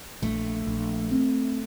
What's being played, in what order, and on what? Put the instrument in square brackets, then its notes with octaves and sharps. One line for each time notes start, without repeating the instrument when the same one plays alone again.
[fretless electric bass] A#1 [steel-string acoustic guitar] A3
[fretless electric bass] A#1
C4